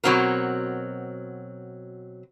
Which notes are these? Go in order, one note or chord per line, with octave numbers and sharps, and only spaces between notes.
B2 F#3 C4 F#4 A#4